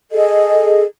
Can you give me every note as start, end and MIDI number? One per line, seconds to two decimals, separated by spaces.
0.12 0.82 68
0.12 0.82 69
0.12 0.82 75